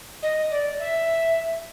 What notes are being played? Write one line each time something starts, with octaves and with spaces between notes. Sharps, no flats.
D#5
D5
E5